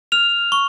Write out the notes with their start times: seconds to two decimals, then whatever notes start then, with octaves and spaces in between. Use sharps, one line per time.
0.12 F6 F7
0.52 C#6